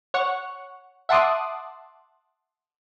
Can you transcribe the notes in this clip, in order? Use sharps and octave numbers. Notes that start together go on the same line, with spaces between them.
C#5 F#5 C#6
E5 F#5 A5 C6 D6 D#6